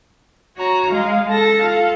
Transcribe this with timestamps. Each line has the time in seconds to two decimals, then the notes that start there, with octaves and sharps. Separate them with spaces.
0.57 F#4 C#5 A#5
0.91 G#3 F5
1.30 A4 A5 A#6
1.63 F4 F5